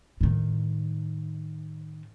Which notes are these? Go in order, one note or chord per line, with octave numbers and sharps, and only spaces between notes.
A2 D#3